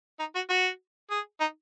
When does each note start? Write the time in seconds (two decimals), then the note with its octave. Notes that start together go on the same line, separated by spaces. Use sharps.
0.19 D#4
0.35 F#4
0.49 F#4
1.10 G#4
1.40 D#4